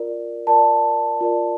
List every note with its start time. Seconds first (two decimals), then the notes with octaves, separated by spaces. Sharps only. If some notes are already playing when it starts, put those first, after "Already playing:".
Already playing: F4 A#4 D5
0.47 F4 A#4 D5 A5
1.21 F4 A#4 D5